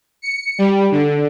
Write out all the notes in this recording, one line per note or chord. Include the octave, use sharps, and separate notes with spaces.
C#7
G3
D3